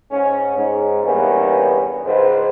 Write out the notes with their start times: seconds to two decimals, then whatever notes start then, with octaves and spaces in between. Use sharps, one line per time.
0.11 G#2 C#4
0.56 G#2
1.03 E2 G2 A#3 B3 C#4
2.05 C#2 G#2 B4 C5